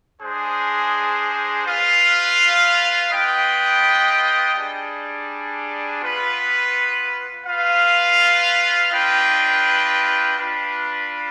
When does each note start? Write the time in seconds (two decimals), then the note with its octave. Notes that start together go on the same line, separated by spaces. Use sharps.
0.21 G#3 D4 G#4 C5
1.65 F4 B4 F5
3.11 B3 F4 B4 D#5 G5
4.56 G3 D4 G#4
6.01 B3 F4 B4
7.45 F4 B4 F5
8.90 D4 F4 B4 D#5 G5
10.36 D4 F4 B4